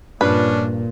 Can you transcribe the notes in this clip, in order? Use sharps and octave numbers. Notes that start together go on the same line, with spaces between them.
G2 A#2 F3 C#4 D4 B4